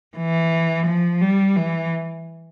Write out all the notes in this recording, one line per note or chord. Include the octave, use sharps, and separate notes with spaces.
E3
F3
G3
E3